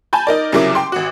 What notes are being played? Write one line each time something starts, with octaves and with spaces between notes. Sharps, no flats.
G#5 A5 B5 G6
D#4 A#4 D5
C2 C#3 F#3 E4 A#4 D6
G5 C6
G#1 F#4